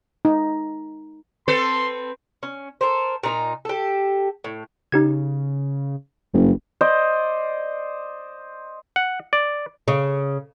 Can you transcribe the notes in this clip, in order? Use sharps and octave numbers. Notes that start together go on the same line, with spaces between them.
D#4
C4 A4 B4 C6
C#4
A4 A#4 C5
A#2 D#4 A#5
G4 A4
A2
C#3 D#4 G4 G#6
F#1 G2
C5 D5 D#5
F#5
D5
C#3